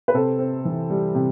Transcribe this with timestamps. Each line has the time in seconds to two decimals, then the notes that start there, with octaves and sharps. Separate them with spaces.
0.08 B4
0.14 C3 A4 C5
0.39 C4
0.65 E3
0.90 G3
1.15 C3